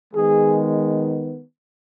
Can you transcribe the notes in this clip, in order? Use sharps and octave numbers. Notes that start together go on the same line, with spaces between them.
D#3 G#3 B3 G#4